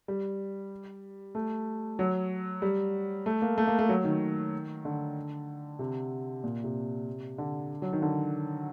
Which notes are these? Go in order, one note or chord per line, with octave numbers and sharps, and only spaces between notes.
G3
A3
F#3
G3
A3
A#3
A3
A#3
A3
F#3
D#3
D3
C3
A#2
C3
D3
F#3
D#3
D3